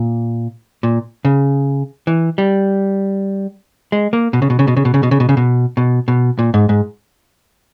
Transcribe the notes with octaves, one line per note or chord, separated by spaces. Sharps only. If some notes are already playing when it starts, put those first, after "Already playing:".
Already playing: A#2
A#2
C#3
E3
G3
G#3
A#3
B2
C#3
B2
C#3
B2
C#3
B2
C#3
B2
C#3
B2
C#3
B2
B2
B2
A#2
G#2
G#2